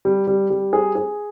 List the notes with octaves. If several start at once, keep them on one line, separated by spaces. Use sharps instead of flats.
G3
G3
G3
G#4
G#4